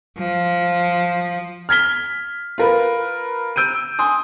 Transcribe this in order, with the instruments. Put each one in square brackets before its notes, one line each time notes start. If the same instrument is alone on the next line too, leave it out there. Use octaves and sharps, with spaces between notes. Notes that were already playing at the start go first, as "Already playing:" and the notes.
[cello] F3
[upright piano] F6 G#6 B6 G7
F4 A#4 B4
E6 G6 D7 D#7
G#5 C6 D#6